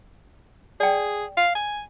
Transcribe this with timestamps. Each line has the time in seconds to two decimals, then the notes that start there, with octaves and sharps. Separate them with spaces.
0.80 G#4 D5 G5
1.37 F5
1.55 G#5